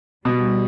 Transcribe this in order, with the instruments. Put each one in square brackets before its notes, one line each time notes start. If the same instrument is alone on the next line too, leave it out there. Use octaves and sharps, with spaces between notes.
[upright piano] B2 [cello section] G3